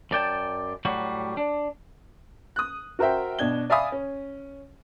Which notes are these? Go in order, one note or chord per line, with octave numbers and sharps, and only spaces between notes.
F#2 D5 G5 A5
A2 F#3 G3 F#4
D4
D#6 F#6
F#4 A#4 C5 E5 G5
B2 D4 G#6 G7
D5 E5 F5 G#5 B5 D#6
C#4